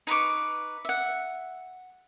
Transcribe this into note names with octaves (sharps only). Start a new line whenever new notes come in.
D#4 B4 C#6 D6
E5 F#5